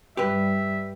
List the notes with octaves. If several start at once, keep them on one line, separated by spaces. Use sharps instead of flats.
G2 G3 G4 B4 E5